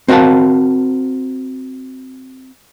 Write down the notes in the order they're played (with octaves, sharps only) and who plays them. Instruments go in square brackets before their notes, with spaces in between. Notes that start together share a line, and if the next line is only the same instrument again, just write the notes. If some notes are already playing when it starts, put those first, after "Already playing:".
[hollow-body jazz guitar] C4 F#4 A#4 F5 A5